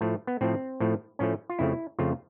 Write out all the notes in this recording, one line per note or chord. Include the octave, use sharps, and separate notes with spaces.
A2 F3 A3
B3
A2 F3 A3 C4
A2 F3 A3
A2 F3 A3 C#4
F4
F2 C#3 F3 A3 E4
F2 C#3 F3 A3 F4